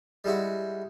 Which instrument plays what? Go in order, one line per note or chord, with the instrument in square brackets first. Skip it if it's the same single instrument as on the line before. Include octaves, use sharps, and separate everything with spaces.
[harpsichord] G3 G#3 E4 F#4